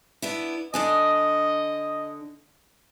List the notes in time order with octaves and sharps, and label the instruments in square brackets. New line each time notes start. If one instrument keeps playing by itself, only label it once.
[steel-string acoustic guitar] B3 D4 E4
[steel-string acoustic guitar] D3 D4 G#5 [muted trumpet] D#5